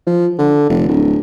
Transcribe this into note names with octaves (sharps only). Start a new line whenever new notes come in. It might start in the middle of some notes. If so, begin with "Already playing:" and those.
F3
D3
F1
D1